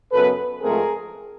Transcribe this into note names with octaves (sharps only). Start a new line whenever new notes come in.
F#2 C#3 F#3 B3 A4 B4
G#2 F3 A3 C4 G#4 A#4